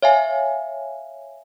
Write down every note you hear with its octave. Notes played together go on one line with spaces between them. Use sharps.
C#5 E5 F5 G#5